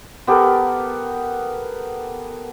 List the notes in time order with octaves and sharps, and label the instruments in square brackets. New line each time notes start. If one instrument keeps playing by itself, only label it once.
[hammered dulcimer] B3 G4 A4 A#4